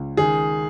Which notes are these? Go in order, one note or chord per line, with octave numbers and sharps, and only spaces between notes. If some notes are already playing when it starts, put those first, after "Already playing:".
Already playing: C#2
D#3 G#4